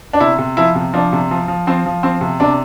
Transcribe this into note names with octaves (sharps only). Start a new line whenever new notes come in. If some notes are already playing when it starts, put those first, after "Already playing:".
D4
C3 E4
C3
F3 E4
C3
F3 D4
C3
F3
F3
F3 C4
F3
F3 C4
C3
C3 D4